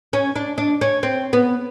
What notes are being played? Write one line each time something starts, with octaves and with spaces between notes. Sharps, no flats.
C#4
D4
D4
C#4
C4
B3